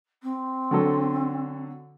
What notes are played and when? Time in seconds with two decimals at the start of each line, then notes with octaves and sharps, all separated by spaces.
0.22 C4
0.71 D3 F#3 A4